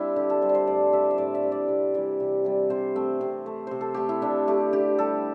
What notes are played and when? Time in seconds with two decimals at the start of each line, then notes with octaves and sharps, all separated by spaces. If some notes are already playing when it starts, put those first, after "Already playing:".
Already playing: G3 C4 D4 E4
0.16 D3 G4
0.30 A4
0.42 G3 C5
0.49 D5
0.55 C5
0.67 A2 D5
0.92 G3 E5
1.11 E5
1.18 A2 D5
1.35 E5
1.43 G3
1.52 D5
1.69 C3
1.94 E3 G3
2.20 C3
2.45 E3 G3
2.70 C3 C5
2.96 A3 C4
3.21 C3
3.46 A3
3.67 C3 C5
3.81 A4
3.94 A3 G4
4.09 E4
4.22 C3 D4
4.47 A3 G4
4.73 D3 G4
4.98 G3 A4